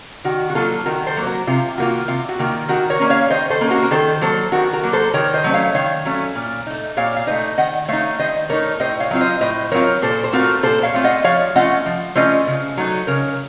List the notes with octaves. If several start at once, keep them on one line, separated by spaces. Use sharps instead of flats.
D#3 F#4
F#4
F#3 A#3 F4 A4
D#3 F#4 A#4
A4 C5
F#3 A#3
F#4 A#4
C3 F4
D#3 A#3 F4 F#4
C3 F4
F#4
D#3 A#3 F4
D#3 F#4 A#4
A#4 C#5
A#3 C#4
C#5 F5
D#3 C5 D#5
A4 C5
A#3 C#4
F#4 A#4
A#4
D#3 A4 C5
F#3 A#3 A4 C5
D#3 F#4 A#4
F#4 A#4
F#3 A#3
A4 C5
D#3 A#4 C#5
C5 D#5
F#3 A3 C#4
C#5 F5
D#3 C#5 F5
F#3 A3 C#4
A#2
A3 D#4
A#2 C#5 F5
F5
A3 D#4 C5 D#5
D#3 D#5 F#5
A3 D#4 C#5 F5
D#3 C5 D#5
A3 D#4 A#4 C#5
A2 C5 D#5
C#5 F5
F#3 C4 F4
C5 D#5
A2 C5 D#5
F#3 C4 F4 A#4 C#5
A#2 A4 C5
C5
A3 C4 F4 F#4 A#4
A#2 A4 C5
C#5 F5
A3 C4 F4
D#5 F#5
F3 C#5 F5
A3 C#4 F4 D#5 F#5
F3
A3 C#4 F4 C5 D#5
C#3
F#3 A3 D#4
C#3 A#4 C#5